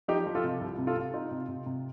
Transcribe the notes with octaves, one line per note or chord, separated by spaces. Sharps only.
F3 D#4 G4
F3
F4 A4
C3
C2
C3
F4 A4
C3
D#4 F4
C3
C3
C3